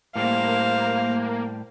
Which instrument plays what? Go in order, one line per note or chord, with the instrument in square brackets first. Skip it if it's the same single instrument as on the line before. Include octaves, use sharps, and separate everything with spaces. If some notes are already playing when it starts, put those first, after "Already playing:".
[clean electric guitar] A2 G3 [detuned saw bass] A#3 [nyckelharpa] C5 F5